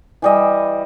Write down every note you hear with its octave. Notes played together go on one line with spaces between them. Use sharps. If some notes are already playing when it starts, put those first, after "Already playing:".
E3 G3 D#5